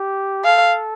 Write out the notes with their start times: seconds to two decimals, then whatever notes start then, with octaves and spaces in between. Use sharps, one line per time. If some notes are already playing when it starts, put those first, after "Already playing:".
Already playing: G4
0.44 A4 F5